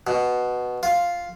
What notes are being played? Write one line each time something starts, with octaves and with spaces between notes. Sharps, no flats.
B2
F4